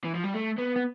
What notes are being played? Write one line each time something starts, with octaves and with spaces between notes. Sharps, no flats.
E3
F3
G3
A3
B3
B3